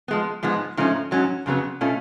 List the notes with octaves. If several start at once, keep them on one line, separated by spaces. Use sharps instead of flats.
F3 G#3 B3
G#2 F3 G#3 B3
G#2 F3 A3 C#4
G#2 F#3 C#4
F2 C#3 F#3 B3
B2 A3 C#4 F4